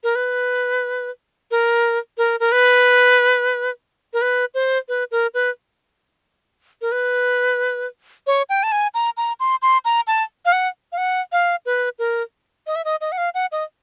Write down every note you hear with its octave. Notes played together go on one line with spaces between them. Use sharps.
A#4
B4
A#4
A#4
A#4
B4
A#4
B4
C5
B4
A#4
B4
A#4
B4
C#5
G5
A5
G#5
A#5
A#5
C6
C6
A#5
A5
F5
F#5
F5
F#5
F5
B4
A#4
D#5
E5
D#5
D#5
F#5
F5
F#5
D#5